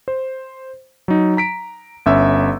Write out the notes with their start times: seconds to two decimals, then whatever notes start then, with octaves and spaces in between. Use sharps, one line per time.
0.08 C5
1.08 F#3 D#4
1.37 A#5 B6 D7
2.06 G1 C#4 E5 E6